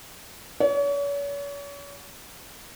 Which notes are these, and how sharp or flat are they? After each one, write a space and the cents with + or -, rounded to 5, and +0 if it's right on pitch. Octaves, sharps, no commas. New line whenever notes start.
C#5 +40